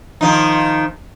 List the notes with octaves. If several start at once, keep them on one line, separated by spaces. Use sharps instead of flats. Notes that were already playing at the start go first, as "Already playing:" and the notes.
D#3 F3 D#4